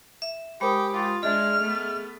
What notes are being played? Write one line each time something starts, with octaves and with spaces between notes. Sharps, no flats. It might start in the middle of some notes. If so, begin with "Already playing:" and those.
E5
G#3 G4 A#4 C5 B5 D#6
F4
G#3 D4 G#4 D#5 E5 F6
A3 B3